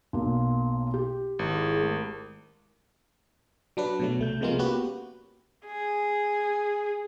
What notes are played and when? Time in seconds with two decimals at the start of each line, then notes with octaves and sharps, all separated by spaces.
0.13 B1 A#3 C6
0.94 G4
1.39 G#1 E4 G#4
1.77 G#3 A3 A#4
3.77 F#3 D4 B4
4.00 B2 F#3 A3
4.19 C2 A3 G6
4.41 C3 F3 G#3 A#3 B3 F4
4.59 A#3 B3 C#4 F#4 G4 B4
5.66 G#4